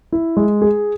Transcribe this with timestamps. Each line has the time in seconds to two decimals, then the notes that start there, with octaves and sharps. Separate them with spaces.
0.12 E4
0.37 G#3
0.62 G#4